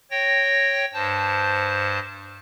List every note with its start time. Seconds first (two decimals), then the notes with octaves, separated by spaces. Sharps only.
0.11 C#5 G5 A#6
0.94 G2 C5 A5